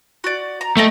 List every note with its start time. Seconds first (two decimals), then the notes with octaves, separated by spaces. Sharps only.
0.24 F#4 D5
0.61 A#5
0.77 A3 A4 D#5 G5 A#5